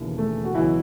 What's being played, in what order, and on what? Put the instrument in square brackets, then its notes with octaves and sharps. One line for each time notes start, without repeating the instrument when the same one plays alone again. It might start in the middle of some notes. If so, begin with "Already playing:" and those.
Already playing: [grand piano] E1 D#2 C#3 E3
A3
F#4
C#2 B2 E3 F#3 E4